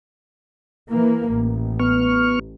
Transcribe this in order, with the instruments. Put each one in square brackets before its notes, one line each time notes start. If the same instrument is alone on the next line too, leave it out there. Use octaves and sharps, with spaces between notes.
[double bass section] E3 A#3
A1
[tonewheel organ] B3 C#6 F6